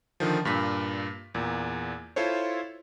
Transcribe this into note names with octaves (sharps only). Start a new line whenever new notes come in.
D3 D#3 F3
G2 A#2 B6
E2 A#2
E4 F4 A4 C5 C#5